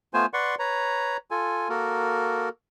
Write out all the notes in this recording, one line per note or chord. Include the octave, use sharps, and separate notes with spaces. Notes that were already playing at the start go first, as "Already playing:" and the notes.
A3 B3 F4 C5 G#5
B4 D5 F#5 C6 C#6
B4 C#5 A#5
F4 A4 G#5
A#3 F#4 A4 A#4